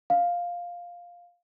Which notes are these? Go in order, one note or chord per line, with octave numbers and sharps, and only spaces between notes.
F5